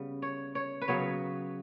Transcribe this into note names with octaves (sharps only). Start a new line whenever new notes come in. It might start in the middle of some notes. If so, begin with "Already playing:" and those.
Already playing: C#3 G3 B3
C#5
C#5
B4
C#3 F#3 B3 C#5